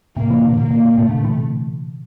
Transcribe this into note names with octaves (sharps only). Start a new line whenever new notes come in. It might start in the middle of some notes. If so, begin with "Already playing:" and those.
A2 C3 A#3
C3 E3
A#2 D3
A#2 A#3
A#2
A#2
A2 C3 A3
A#2 D3
C3 E3